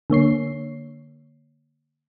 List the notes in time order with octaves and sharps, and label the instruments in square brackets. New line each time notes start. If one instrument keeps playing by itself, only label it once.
[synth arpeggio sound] D3 A#3 C#5 C7